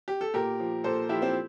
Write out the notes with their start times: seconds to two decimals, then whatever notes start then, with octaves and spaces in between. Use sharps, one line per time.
0.08 G4
0.21 A4
0.34 A#2 G4 A#4
0.60 F3
0.84 A#2 A4 C5
1.09 F3 E4 G4
1.22 C4 E4